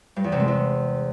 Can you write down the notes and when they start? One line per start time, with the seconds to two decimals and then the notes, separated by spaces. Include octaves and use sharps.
0.16 G2
0.24 E2
0.32 C3
0.40 G#3
0.48 E2